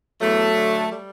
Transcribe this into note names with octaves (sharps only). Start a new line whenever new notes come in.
E2 F#3 A3
D3
G3